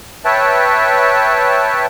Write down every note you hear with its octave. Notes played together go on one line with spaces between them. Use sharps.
B4 C#5 E5 G5 A5